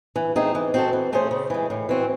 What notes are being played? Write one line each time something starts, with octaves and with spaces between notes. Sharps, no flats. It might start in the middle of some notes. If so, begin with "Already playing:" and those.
E3
A3 C4 D#4 G#4
E3
C4 F#4 A4
E3
A3 C#4 G#4 C5
C#3
E3 G#3
A2
E3 C4 F#4